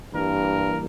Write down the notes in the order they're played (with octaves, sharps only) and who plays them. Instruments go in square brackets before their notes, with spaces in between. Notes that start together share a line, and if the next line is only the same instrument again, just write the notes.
[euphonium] G2 [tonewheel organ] E3 G3 A#3 [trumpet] A#4